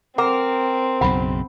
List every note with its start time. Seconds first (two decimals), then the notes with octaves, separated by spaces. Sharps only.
0.18 C4 A#4 F#5 A#5 D6
1.01 B1 F#2 C#3 F#5 B5